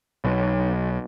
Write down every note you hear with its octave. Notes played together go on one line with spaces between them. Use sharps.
B1